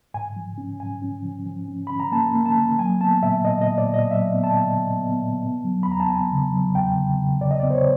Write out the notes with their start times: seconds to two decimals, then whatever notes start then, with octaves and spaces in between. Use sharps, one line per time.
0.14 G#2 G#5
0.36 F3
0.58 C#4
0.80 G#2 G#5
1.02 C#4
1.24 F3
1.46 F3
1.68 C#4
1.87 C#4 B5
2.00 A#5
2.12 A#3 A5
2.35 A#3
2.46 A5
2.57 A#3
2.78 F#3 G#5
3.01 B3 A5
3.23 A#2 E5
3.45 A#2 D#5
3.61 D#5
3.67 A#2
3.78 D5
3.89 A#2
3.94 D#5
4.10 F#3 E5
4.33 B3
4.44 A5
4.54 A#2
4.76 A#2
4.99 B3
5.21 A#2
5.43 B3
5.65 F#3
5.83 B5
5.87 E2 A#5
6.00 A5
6.09 B3 G#5
6.31 C#3
6.53 F#3
6.75 E2 G5
6.97 C#3
7.19 C#3
7.41 C#3 D5
7.51 D#5
7.60 B3 D5
7.70 C5
7.74 C#5